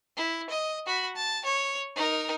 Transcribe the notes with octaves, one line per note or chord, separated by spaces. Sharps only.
E4
D#5
F#4 B5
A5
C#5
D#4 A#4